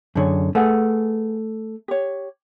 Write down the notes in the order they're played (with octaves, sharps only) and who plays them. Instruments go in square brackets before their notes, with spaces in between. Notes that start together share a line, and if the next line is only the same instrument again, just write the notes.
[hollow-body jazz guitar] F#2 D3 [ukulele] D4 G#4 C#5
[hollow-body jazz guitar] A3 [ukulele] G#4 B4 F#5
[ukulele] G4 C#5